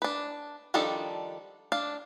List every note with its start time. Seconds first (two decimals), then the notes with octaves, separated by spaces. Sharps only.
0.02 D4 B4
0.74 D#3 F3 G3 D4 A4
1.72 D4 F5